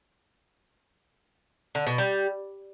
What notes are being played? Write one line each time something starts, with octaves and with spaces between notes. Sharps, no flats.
D3
B2
G3